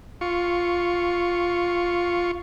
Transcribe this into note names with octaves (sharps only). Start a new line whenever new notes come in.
F4 C#6